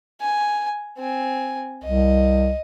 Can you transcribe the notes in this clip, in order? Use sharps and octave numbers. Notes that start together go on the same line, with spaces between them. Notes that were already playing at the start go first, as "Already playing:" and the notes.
G#5
C4 G#5
C2 D#5